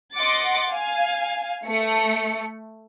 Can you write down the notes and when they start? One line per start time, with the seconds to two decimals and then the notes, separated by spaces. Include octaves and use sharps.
0.14 D#5 F#5 C6 D6 A6 C#7
0.70 F5 G#5
1.66 A3 C#7